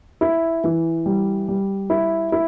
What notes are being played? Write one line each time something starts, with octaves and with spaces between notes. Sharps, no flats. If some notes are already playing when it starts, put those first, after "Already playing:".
E4
E3
G3
G3
E4
E4